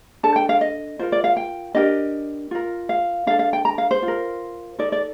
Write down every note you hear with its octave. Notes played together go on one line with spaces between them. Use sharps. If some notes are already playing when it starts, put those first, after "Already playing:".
D4 A4 A5
G5
F5
D#5
F4 A#4 C5
D5
F5
G5
D4 G4 A#4 D#5
F4 A#4
F5
D4 A4 F5
F5
G5
A#5
F5
C5
F4
A#4
D#4 A4 D5
D5